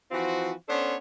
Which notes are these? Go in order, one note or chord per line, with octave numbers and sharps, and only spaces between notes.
E3 F3 C4 F4 F#4
B3 C#4 D4 A4 C5 C#5